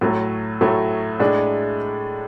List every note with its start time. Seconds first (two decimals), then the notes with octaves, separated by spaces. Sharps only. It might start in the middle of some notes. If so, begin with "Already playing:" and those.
0.01 A2 F#3 A3
0.61 A2 F#3 A3
1.20 A2 G#3 D4